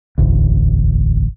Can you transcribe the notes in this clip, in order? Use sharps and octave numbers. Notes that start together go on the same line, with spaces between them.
E1 A1 D2